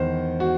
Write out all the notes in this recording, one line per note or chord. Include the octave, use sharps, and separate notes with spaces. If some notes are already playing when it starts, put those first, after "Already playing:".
Already playing: E2 D#3 C5
F#4